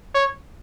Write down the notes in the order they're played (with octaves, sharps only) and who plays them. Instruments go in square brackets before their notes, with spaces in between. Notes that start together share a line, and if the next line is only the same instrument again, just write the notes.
[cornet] C#5